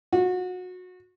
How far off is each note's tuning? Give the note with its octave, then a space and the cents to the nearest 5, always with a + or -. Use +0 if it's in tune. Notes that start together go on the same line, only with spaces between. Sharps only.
F#4 -25